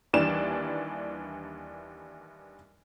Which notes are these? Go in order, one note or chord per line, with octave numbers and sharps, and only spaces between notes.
D#2 E3 G3 D4 D5 E7